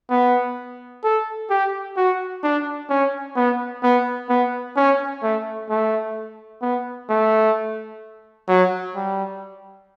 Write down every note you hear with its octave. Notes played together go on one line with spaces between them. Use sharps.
B3
A4
G4
F#4
D4
C#4
B3
B3
B3
C#4
A3
A3
B3
A3
F#3
G3